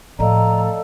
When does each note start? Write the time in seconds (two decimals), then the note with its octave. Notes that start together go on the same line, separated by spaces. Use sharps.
0.19 A2 F3 A4 D5 D#5 F5 A#5